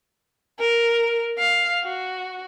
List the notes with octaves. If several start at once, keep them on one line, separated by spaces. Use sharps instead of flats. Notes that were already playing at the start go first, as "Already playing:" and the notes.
A#4
F5
F#4